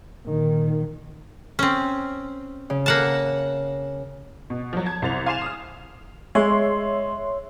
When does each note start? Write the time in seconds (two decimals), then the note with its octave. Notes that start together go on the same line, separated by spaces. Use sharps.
0.24 A#2 D#3
1.59 C4 C#4
2.70 C#3
2.86 A#3 F#5 A5
4.50 B2
4.73 F3 F#3
4.86 A5 G#6
5.02 C2 C5 A6 F7
5.26 F5 G#5 C6 C7 E7 F7
5.42 D#6 F6
6.35 G#3 C#5 E5 C6